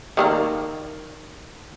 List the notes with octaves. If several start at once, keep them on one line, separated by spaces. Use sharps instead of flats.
D#3 A3 A#3